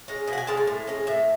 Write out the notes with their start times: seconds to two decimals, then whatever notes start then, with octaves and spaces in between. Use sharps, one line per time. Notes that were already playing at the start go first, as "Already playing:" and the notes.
0.08 G#3 C#4
0.28 B2 G#5
0.33 F#5
0.38 G#5
0.47 G#3 C#4 A5
0.57 G#5
0.67 A2
0.87 G#3 C#4
1.07 A2 E5